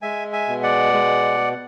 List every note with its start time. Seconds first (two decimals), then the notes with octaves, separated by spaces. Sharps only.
0.02 G#3 E5 G#5
0.33 E5 G#5
0.48 B2
0.63 D5 F#5
0.93 G#3